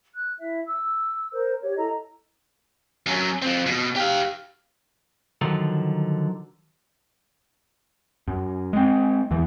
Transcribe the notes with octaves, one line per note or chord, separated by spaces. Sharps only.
F#6
E4 E5
E6
A#4 C5
G4 C#5
E4 A4 D#5 A#5
F#2 F#3
F3 C4
B2
G4 F5
D3 D#3 F3 F#3
F#2
G#3 C4
E2 E3